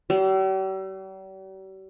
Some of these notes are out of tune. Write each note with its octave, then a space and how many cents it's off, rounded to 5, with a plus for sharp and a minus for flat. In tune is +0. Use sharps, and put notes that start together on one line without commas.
G3 -45